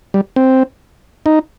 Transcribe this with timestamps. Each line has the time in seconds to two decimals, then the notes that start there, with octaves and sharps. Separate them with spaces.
0.14 G3
0.36 C4
1.26 D#4